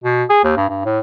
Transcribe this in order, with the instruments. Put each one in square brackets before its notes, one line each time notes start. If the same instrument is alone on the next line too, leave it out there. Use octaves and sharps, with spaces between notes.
[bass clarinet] B2
G#4
D#2
G2
G2
A2